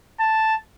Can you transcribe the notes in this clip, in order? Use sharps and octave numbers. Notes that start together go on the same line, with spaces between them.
A5